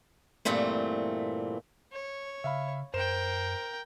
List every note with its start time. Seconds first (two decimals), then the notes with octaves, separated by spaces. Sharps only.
0.45 G2 A#2 E3 A3 C4
1.92 C#5
2.44 C#3 E5 F5 B5
2.94 F#2 A#4 C5 G5 E7